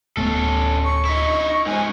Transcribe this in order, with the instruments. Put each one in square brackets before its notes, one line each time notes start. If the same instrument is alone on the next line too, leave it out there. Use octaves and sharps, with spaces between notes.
[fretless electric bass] D1 A3 B3 [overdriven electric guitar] C#4 A4
[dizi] C#6
[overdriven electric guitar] D#4 E4
[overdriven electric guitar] G#2 C#4 [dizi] G#5